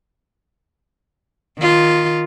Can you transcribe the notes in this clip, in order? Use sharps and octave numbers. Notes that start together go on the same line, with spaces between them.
D#3 F4